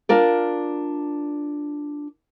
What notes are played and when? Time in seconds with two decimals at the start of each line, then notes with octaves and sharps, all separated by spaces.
0.09 D4 F4 A#4 D5